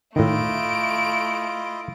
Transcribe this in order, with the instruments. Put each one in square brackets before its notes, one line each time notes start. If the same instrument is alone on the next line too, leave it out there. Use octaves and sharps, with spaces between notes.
[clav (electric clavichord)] A2 D#3 [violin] A3 D7 [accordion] E4 F4 D#5